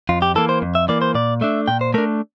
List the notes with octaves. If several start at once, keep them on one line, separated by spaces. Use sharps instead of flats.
F2 F4
G4
E3 A#3 A4
C5
F2
E5
E3 A#3 D5
C5
A#2 D5
A3 D4 E5
A#2 G5
C5
A3 D4 A#4